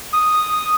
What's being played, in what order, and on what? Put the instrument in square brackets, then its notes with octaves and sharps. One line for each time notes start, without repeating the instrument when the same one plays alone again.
[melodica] D#6